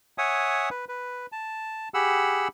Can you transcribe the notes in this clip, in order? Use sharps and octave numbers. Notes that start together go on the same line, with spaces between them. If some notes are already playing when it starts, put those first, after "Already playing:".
C#5 E5 F#5 G#5 D#6
B4
B4
A5
G4 G#4 F#5 B5 E6